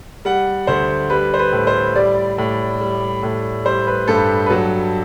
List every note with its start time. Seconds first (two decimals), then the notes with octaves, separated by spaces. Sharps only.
0.25 G3 F#5
0.67 D2 C5
1.10 G3 B4
1.34 C5
1.39 B4
1.52 A2
1.67 C5
1.95 G3 D5
2.38 A2
2.81 G3
3.23 A2
3.65 G3 C5
3.87 B4
4.08 G2 A4
4.46 B4
4.50 F#3 A4